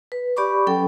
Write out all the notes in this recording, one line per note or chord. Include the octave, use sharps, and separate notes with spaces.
B4
G4 D5 B5 C#6 D6
F#3 C#4 A4 G5